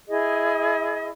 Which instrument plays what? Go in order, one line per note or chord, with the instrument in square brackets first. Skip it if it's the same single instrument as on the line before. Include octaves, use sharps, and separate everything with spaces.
[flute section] E4 G#4 D#5